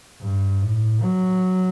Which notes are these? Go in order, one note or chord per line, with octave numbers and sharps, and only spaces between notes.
G2
A2
F#3